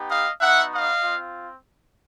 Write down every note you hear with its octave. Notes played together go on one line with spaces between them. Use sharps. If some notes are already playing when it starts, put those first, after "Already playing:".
Already playing: B3 D#4 G4
D#5 F5
B3 D#4 F#4 E5 F#5
D#5 F5
C4 F4